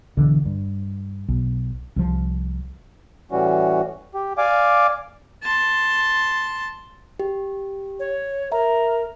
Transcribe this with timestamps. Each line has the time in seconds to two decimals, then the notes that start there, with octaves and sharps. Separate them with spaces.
0.17 B1 D3 E3
0.45 G2
1.28 B1
1.96 C2 F3
3.31 A2 E3 G3 C#4 F#4
4.15 G4
4.38 D5 F5 G#5 D6
5.44 A5 C6
7.19 G4
7.99 C#5
8.52 A#4 E5 A#5